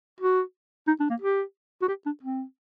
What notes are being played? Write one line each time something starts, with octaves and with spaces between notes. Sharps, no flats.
F#4
D#4
D4
A#3
G4
F#4
G4
D4
C4